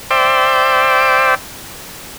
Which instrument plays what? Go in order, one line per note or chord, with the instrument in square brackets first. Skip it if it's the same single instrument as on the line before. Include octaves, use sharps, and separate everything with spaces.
[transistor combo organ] C5 D5 E5 G5